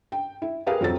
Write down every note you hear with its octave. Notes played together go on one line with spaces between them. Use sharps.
G5
E4
G4 G#4 A#4 B4 F5
F2 F#3 C4 A4 A6